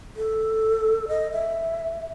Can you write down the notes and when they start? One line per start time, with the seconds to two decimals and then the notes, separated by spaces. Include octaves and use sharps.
0.16 A4
1.08 D#5
1.32 E5